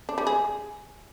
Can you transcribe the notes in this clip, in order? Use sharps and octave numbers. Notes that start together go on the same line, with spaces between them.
D4
G3
G#4